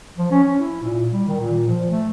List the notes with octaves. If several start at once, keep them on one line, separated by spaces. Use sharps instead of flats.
F3
C#4
C#4
E4
A#2
G3
D#3
A#2
F3
A3